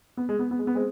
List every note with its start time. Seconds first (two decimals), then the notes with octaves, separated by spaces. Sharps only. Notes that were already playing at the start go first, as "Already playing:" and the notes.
0.17 B3
0.29 G#3
0.39 B3
0.51 B3
0.59 G#3
0.67 B3
0.75 G#3 C4